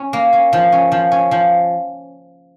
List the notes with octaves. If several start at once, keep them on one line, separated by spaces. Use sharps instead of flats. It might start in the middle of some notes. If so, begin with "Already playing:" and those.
Already playing: C#4
A#3
C#4
F3
C#4
F3
C#4
F3